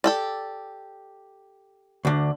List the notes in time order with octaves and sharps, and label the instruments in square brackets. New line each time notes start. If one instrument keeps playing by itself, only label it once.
[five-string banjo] G4 A4 D5
[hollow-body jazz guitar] D2 D3